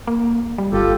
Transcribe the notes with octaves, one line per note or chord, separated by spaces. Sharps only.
A#3
G3
G1 F4 G4 A4